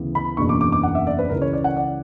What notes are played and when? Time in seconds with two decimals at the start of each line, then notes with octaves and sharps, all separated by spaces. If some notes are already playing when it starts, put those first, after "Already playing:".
Already playing: D2 C#3 E3 B3
0.15 B5
0.37 F#1 E2 B2 A#3 D4 C#6
0.49 D6
0.61 D6
0.72 D6
0.83 F#5
0.95 E5
1.07 D5
1.19 B4
1.30 C#2 C#3 E3 A#4
1.42 C#5
1.53 D5
1.64 F#5
1.76 D5